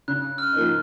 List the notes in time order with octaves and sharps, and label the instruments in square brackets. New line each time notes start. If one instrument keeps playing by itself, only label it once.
[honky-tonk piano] C#3 [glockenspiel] F#6
[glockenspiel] F6
[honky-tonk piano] F3 A#3 D#4